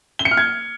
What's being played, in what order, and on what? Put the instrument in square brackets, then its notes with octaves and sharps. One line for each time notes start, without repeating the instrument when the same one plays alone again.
[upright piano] G7
C#7
F6
G#6